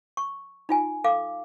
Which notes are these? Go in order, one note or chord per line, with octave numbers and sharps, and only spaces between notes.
C#6
D#4 F4 G#5
A4 F5 D6